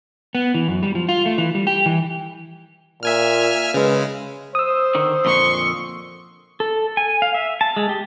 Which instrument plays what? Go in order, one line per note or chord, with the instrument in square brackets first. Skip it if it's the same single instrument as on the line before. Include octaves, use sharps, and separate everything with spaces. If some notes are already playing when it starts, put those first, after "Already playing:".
[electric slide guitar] B3
E3
F#2
G3
F3
F4
A3
E3
G3
G4
E3
[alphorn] A#2 [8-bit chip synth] E5 G#5 F6
[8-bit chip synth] C#3 G#3 [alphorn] B4
[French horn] C5 [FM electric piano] D#6 E6
[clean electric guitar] D3 D#3
[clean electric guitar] F2 A#2 D3 [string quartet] C6 C#6
[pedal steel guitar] A4
G#5
F5
E5
A5
G#3
G4